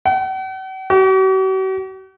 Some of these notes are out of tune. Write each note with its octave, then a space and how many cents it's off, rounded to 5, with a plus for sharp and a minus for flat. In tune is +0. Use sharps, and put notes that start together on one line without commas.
F#5 +45
F#4 +45